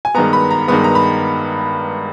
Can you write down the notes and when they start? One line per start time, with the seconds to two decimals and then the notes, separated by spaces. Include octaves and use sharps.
0.05 G#5
0.15 G2 D#3 G#3 B3 A#5
0.33 B5
0.50 A#5
0.68 G2 D#3 G#3 B3 B5
0.84 A#5
0.95 B5